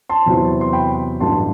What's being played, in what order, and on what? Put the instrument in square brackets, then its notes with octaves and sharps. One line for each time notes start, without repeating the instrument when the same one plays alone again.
[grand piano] A5 C6
E2 C3 F#3 C4 E4
C6
G5 B5
A1 G2 F#3 A3 A5 C6